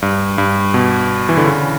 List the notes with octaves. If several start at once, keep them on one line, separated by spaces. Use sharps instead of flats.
G2
G2
B2
E3
D3
C#3